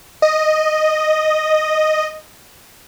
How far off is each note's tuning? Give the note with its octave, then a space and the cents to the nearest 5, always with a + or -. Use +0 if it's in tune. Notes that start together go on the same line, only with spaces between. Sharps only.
D#5 -5